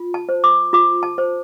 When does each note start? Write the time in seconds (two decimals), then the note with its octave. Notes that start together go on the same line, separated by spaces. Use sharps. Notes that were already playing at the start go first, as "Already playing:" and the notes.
Already playing: F4
0.14 A5
0.29 C5
0.44 D6
0.73 F4 D6
1.03 A5
1.18 C5